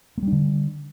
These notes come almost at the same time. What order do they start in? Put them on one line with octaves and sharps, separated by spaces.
A#3 G3 D4 D3